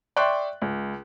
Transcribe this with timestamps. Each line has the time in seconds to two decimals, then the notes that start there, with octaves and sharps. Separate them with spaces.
0.17 D5 E5 G5 C6 C#6 F#6
0.62 C#2